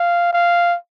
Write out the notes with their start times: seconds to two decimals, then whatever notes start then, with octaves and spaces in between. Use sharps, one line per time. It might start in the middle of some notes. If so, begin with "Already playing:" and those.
Already playing: F5
0.33 F5